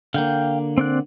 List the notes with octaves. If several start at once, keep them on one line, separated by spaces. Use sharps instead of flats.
D3 A#3 F5 G5
C4 D5 F#6